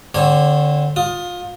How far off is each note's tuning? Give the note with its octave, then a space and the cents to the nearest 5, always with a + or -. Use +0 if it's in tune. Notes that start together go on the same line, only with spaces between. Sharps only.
D3 +0 C4 +5 C#5 -30
F4 +25 D#6 +0